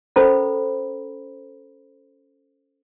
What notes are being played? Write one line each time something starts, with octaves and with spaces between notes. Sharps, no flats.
C#4 A4 A#4 C5 A#5 B5